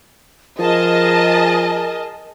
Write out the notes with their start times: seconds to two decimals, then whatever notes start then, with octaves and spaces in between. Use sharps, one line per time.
0.59 F3 G#4 A#4 D#5 A5